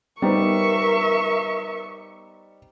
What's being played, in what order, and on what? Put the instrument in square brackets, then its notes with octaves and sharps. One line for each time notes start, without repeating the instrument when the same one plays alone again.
[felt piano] G3 D#4 C5 [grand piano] B3 [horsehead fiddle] A#4 E5 [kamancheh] C#6